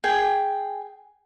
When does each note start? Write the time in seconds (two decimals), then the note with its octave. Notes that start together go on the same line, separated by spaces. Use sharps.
0.04 G#4 G5